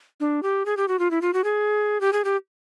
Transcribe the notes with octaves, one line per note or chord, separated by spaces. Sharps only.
D4
G4
G#4
G4
F#4
F4
E4
F4
F#4
G#4
G4
G#4
G4